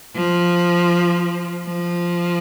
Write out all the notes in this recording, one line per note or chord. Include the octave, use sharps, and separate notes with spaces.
F3
F3